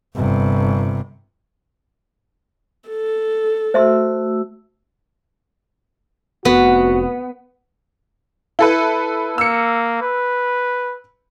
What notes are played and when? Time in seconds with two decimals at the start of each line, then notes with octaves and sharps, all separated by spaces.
0.16 G1 C3
2.90 A4
3.74 A3 F#4 C5 E5 C6 E6
6.45 F1 B3 F#4
8.59 E4 A4 B4
9.38 A#3 E6 C#7
10.02 B4